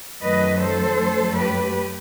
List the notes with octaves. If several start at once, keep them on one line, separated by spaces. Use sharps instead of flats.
F#2 D#3 F#3 A3 B4 D#5
A4 C5
F#2 F#3 A3
G4 B4